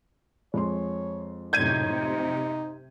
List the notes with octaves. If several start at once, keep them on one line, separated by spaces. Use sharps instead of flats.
F2 G#3 C#5 C6
F#2 A2 C3 D#4 G6 G#6 D#7
C3